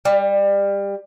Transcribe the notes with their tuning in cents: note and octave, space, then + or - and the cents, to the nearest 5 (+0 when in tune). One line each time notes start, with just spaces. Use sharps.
G3 +25